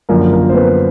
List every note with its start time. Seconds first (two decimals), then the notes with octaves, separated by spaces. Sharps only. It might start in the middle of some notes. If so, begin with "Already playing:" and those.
0.09 F#2 D3 F3 A#3 A#4
0.33 A#3 A#4
0.49 C5
0.54 B3 B4